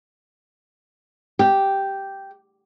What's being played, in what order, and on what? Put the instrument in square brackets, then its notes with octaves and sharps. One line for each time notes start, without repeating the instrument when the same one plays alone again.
[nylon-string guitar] G4